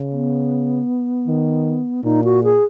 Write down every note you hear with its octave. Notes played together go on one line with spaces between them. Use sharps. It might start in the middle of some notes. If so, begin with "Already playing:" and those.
Already playing: C#3
B3
D#3
A#2 D#4
F#4
G#4